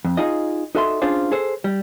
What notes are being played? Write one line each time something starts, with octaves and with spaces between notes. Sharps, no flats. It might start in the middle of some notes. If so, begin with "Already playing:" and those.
F2
D#4 F4 G#4 D#5
D#4 F#4 A4 E5 G#5 C6
C#4 D4 F4 G#4 C5
G#4 A4 C5
G3